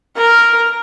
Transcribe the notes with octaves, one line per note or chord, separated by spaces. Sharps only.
A#4